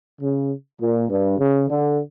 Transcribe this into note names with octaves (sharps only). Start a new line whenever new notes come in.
C#3
A#2
G2
C#3
D3